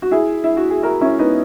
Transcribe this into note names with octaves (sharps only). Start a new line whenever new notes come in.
F#4
E4 G#4
E4
F#4
G#4
F#4 A#4
C#4 E4
B3 D#4